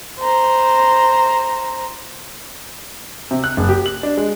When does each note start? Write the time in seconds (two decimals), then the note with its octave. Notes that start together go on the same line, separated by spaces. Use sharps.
0.19 C5 A#5
3.31 C3
3.44 F#6
3.57 F#1
3.69 G4
3.86 F#7
4.03 D4
4.17 G#3